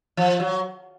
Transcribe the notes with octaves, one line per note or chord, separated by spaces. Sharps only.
F3
F#3